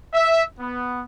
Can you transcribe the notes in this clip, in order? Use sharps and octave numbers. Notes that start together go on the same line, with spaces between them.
E5
B3